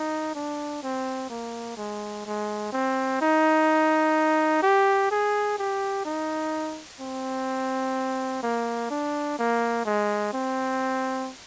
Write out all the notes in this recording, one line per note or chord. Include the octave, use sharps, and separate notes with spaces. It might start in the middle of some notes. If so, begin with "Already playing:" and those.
Already playing: D#4
D4
C4
A#3
G#3
G#3
C4
D#4
G4
G#4
G4
D#4
C4
A#3
D4
A#3
G#3
C4